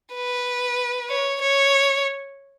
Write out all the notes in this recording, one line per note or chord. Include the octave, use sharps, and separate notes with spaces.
B4
C#5
C#5